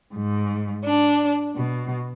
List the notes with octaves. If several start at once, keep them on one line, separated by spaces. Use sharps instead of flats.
G#2
D4
B2